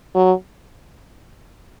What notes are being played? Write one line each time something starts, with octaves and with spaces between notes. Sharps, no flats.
F#3